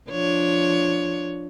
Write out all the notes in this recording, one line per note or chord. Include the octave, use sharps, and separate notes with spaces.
F3 D4 C#5